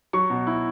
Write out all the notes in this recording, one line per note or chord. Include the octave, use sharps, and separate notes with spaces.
F#3 C#6
B2
E4